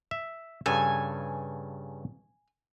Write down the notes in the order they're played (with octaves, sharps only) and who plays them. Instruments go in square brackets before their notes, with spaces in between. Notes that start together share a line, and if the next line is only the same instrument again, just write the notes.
[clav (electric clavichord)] E5
[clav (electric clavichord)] G2 C#3 A4 [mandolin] G#5